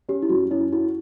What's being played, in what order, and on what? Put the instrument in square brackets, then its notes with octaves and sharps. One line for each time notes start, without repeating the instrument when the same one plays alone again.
[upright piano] C#4 [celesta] G4
[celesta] E4
[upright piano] F#2 [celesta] F#4
[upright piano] C#4 [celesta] E4
[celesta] E4 [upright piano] F#4